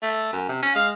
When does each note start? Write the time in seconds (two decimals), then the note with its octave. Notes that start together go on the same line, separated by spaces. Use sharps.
0.02 A3
0.32 F#2
0.48 C3
0.62 C#4
0.75 G#3 F5